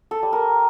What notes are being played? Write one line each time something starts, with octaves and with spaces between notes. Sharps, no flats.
A4
G3
A#4